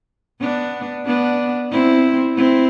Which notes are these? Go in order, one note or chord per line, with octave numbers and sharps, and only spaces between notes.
B3 D4
B3 D4
C4 E4
C4 E4